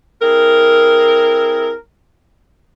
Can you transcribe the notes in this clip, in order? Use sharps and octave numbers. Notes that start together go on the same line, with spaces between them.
C4 E4 G#4 A#4